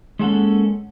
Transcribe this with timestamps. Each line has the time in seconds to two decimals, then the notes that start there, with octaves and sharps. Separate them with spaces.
0.19 G#3 A#3 C#4 A4 F#5